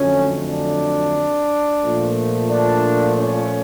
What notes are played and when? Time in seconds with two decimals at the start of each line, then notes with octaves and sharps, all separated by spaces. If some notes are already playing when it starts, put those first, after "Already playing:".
Already playing: F2 D3 F#3 A3 C#4
0.47 D4
1.82 A#2 F3 A3
2.49 D4
3.17 C#4